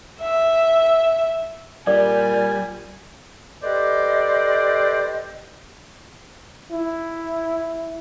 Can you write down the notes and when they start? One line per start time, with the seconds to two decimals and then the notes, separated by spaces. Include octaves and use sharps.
0.21 E5
1.87 A#2 G3 D5 G#5
3.63 G4 A4 B4 C5 D5 D#5
6.71 E4